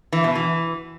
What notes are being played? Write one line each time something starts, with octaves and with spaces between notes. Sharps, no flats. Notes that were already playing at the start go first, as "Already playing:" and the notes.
E3
B2
E3